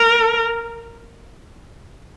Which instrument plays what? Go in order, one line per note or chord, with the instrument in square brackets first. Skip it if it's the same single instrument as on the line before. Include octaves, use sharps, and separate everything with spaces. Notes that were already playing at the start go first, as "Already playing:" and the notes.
Already playing: [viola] A#4